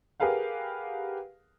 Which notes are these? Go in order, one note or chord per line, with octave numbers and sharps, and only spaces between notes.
G4 G#4 A#4 B4 F5 F#5